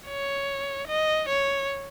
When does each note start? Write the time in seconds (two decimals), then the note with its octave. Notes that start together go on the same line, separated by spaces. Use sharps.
0.08 C#5
0.88 D#5
1.29 C#5